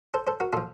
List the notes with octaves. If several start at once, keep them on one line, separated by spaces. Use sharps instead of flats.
A4 C5
A4 C5
F#4 A#4
A#2 F3 F4 A4